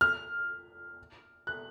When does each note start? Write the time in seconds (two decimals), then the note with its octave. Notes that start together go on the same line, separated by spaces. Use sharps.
0.01 F6
1.47 F#6